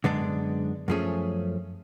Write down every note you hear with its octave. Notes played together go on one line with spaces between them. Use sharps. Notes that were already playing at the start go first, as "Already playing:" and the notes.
F#2 D3 G#3 B3 D4
F#2 F3 A3 C#4 G#4